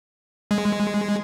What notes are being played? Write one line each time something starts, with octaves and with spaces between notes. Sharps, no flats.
G#3